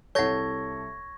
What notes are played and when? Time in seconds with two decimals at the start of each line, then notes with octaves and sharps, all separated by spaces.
0.15 C2 A4 C#5 F#5 C#6 G#6 A#6